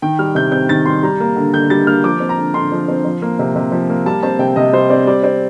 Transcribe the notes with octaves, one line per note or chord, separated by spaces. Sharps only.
D#3 G5
G3 F6
C3 G6
C4 G6
D#3 A6
G3 C6
G3 A#5
A#3
D3
D3 G6
G3 A6
A#3 F6
F3 D6
C4
A#5
D3
D3 C6
F3
C4
F3
A#3
C3
C3
F3
A#3
G3 A5
C4 A5
C3 G5
C3 D#5
G3 C5
C4 D5
G3 D5
C4 D5